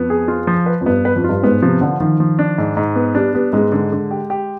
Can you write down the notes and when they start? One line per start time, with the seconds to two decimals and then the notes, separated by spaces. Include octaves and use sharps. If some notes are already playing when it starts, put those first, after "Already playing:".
Already playing: F2 B3
0.10 G#4
0.28 F4
0.47 F3
0.66 B4
0.81 F2
0.86 G2 B3
1.05 B4
1.16 F2
1.24 G2 F4
1.43 G#2 B3
1.62 C3 F3
1.81 D3 F3
2.00 D#3 F3
2.20 F3
2.39 D4
2.58 G#2
2.77 G#2
2.96 B3
3.15 G3 D4
3.34 G3 B3
3.53 G#2 G#3
3.72 D3 G#3
3.92 D3
4.11 G4
4.30 G4